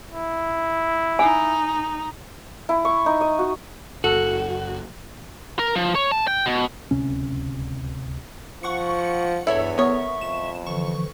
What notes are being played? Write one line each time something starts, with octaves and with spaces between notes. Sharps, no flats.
E4
D#4 G#5
E4
C#6
D#4
D#5
F#4
F#1 F#4 A4
A#4
F3
C#5
A5
G5
B2
D1 C#2 C3 C#4
F3 F#5 C#6 C#7
E2 G2 E4 A4 C#5 E5
B3 A#4 C#5 E5 C#6
F2 E7
D3 E3 F3 C#6